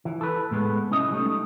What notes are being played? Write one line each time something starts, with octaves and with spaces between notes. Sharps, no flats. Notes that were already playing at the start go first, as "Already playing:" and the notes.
E3
A4 B4
A2 G#3 A3 B3
C2 C#4 E4 D#5
G3 A3 D#4